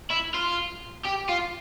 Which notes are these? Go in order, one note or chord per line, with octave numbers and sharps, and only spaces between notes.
E4
F4
G4
F4